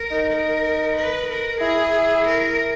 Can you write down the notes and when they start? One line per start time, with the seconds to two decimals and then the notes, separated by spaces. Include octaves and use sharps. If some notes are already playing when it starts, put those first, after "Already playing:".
Already playing: A#4
0.11 D#4
0.33 A#4
0.97 B4
1.29 A#4
1.61 E4 G#4
2.25 A#4